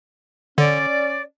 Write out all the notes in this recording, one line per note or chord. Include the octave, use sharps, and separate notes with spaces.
D3 C#4 D5